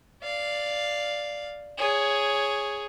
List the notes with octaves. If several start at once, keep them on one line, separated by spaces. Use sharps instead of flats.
D5 F5
G#4 C#5